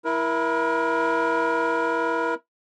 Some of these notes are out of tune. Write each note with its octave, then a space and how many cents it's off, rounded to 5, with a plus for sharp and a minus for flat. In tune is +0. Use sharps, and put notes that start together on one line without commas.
E4 +0 A#4 +30